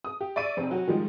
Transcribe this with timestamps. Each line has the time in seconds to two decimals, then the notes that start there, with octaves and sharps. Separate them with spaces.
0.05 D#6
0.21 G4
0.36 D5 E5 C#6 D#7
0.57 F1 C4
0.71 F#3 F#4
0.87 D#3 F3 G3 G#3